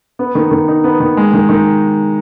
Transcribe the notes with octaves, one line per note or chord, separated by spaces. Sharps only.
B3
D#3
D#3
D#4
B3
D#3
G#3
D#3
D#3